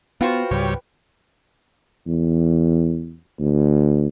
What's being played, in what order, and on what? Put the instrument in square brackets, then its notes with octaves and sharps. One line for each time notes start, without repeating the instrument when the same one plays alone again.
[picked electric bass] B3 [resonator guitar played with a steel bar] F4 F#4 C5 [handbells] B4 G5 B5
[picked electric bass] C#2 G#2 C#3 [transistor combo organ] G3 C#5
[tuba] E2
D2